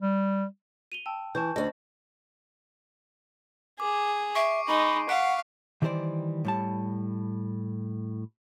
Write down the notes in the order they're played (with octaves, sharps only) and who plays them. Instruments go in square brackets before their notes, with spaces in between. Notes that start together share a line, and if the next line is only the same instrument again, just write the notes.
[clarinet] G3
[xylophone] D#7 F7 G7
G5 A5 E6
[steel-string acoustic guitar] E3 [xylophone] A5 C#6 G6
[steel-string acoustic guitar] D2 D4 [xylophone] D#5
[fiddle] G#4 [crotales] D6
[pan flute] E5 [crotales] C#6 C7 D7
[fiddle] G#3 D#4 [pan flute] B5
[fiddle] F5 [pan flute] F#5 [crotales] F#6 B6 D7
[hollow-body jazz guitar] D#3 E3 G3 G#4 C5 D5
A2 G3 A5